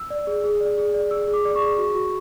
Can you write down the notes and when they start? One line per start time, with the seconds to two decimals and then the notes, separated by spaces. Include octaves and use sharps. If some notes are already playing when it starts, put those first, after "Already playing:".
Already playing: E6
0.10 D5
0.27 G#4
0.44 G#4
0.61 D5
0.78 G#4
0.94 D5
1.11 G#4 E6
1.28 G#4
1.34 D6
1.45 D5
1.55 C#6
1.62 G#4
1.78 F#4
1.95 F#4